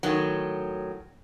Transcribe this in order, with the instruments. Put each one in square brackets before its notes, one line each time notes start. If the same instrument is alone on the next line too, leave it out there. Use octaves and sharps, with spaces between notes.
[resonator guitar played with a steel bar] A2 D#3 F#3